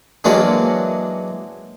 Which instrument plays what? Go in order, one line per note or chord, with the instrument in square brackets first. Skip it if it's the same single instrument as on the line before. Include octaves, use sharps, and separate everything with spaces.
[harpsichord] E3 F#3 G#3 A#3 C#4 D4